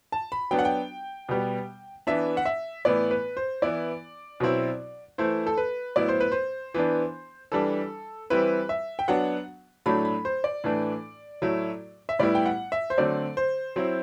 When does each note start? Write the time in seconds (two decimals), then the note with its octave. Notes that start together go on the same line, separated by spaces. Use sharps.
0.12 A5
0.32 B5
0.51 F#3 B3 D4 G5
0.59 F#5
0.65 G5
1.29 B2 G3 B3
2.07 E3 B3 D4 E5
2.37 F#5
2.45 E5
2.85 A2 E3 B3 E4 D5
3.11 B4
3.37 C5
3.62 E3 B3 E4 D5
4.40 B2 F#3 C4 E4
5.18 E3 A3 E4 C5
5.47 A4
5.57 B4
5.96 A2 F#3 B3 E4 D5
6.08 C5
6.20 B4
6.32 C5
6.74 E3 B3 D4
7.52 E3 G3 D4 A4
8.30 E3 G3 C4 E4 B4
8.69 E5
8.99 G5
9.08 F#3 B3 D4 F#5
9.86 A2 F#3 A3 D4 B5
10.05 B5
10.25 C5
10.44 D5
10.64 A2 E3 A3 D4
11.42 A2 F#3 A3 E4
12.09 E5
12.19 A2 G3 B3 E4 D5
12.35 G5
12.46 F#5
12.72 E5
12.90 C5
12.98 D3 F#3 A3 C4 D5
13.37 C5
13.76 F#3 C4 E4